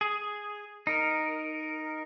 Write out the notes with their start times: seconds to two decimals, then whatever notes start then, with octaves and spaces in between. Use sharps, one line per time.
0.01 G#4
0.87 D#4 A#4